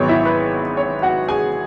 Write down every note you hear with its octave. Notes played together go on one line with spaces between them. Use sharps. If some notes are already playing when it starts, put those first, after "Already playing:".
Already playing: G#1 G#2 F#3 B3 C#5
E4 E5
B4
C#5
F#4 F#5
G#4 G#5